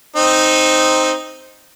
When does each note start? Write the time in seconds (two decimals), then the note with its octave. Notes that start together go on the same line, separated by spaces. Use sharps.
0.16 C4 D#4